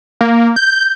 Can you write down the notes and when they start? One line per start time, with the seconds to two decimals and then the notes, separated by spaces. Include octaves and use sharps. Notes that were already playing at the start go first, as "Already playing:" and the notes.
0.21 A#3
0.56 G6